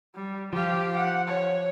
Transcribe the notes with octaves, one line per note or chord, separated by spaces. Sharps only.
G3
F3 G4 F5
F#5
C#5